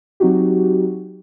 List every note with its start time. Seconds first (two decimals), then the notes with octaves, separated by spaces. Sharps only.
0.20 F#3 C4 D#4 F#4 G4